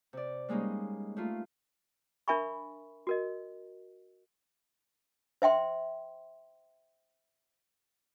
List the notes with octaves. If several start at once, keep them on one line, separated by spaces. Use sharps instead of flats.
C3 D5
G3 G#3 A#3 C#4 D#4
A3 A#3 F4
D4 A#4 E5 G#5 B5 C#6
F#4 A#4 D#5
C5 E5 G5 C6